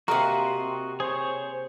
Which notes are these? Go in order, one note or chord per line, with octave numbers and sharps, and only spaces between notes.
C3 A#3 F#4 D#5 F#5 A#5 C6
G#4 C5 C#5